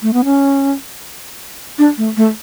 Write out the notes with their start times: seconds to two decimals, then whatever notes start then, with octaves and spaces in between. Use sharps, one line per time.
0.02 A3
0.13 B3
0.25 C#4
1.79 D4
1.98 A3
2.17 A3